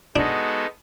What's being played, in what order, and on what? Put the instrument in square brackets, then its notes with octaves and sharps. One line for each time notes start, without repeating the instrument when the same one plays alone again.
[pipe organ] G#3 B3 D#4 F#4 A4 [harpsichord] D4